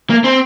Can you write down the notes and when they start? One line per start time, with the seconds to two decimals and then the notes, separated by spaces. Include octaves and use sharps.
0.10 A#3
0.24 C4